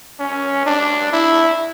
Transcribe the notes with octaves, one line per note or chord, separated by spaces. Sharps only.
C#4
D4
E4